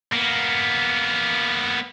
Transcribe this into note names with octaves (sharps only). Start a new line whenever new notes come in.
A#3 B3